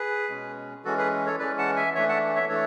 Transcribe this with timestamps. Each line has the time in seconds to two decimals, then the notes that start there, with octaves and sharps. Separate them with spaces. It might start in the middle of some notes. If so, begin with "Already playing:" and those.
Already playing: G#4 B4
0.29 B2 G#3 C#4
0.85 E3 G#3 C#4 F#4 A4
0.98 G#4 B4
1.26 A4 C#5
1.39 E3 G#3 C#4 B4 D5
1.58 F#5 A5
1.76 E5 G#5
1.95 E3 A3 D4 C#5 E5
2.09 F#5 A5
2.36 C#5 E5
2.49 E3 A3 D4 A4 C#5